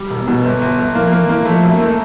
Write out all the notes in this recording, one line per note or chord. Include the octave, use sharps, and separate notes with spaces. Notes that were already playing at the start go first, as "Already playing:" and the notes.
Already playing: G3
E1
B3
B2
G1
G1
G1
F3 A#3
A#3
E3
A#3
F3 A3
F#2
A#3
A3